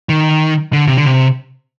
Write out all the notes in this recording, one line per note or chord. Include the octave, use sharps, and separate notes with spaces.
D#3
D3
C3
D3
C3